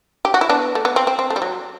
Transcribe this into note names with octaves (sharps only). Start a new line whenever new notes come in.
G4
F#4
E4
B3 D4
A3
B3
C4
C4
C4
A3
G3
F#3